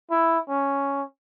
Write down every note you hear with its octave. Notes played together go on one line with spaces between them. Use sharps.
E4
C#4